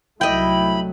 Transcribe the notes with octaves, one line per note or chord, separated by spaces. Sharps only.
C2 F#3 A3 E4 D#5 G5 B5